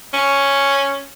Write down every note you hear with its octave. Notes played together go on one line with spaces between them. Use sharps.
C#4